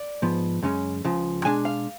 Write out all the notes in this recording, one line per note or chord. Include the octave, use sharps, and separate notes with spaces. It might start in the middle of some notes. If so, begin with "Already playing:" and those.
Already playing: D5
G#2 F3 B3
F#2 C#3 G#3 C#4
C#2 C#3 F3
B2 G#3 D4 G#5
F5